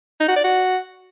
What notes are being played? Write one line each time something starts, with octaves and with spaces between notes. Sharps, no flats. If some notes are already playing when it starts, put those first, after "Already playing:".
D#4
F#4
D5
F#4